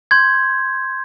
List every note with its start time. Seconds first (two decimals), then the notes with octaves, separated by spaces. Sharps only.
0.11 C6 G6 G#6